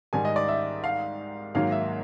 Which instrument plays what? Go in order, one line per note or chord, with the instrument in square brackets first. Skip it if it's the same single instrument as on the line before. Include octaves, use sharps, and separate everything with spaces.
[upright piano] G#2 D#3 G3 [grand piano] G#5
[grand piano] D#5
D5
E5
F5
[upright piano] G#2 D#3 F#3 A#3 [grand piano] F5
[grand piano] E5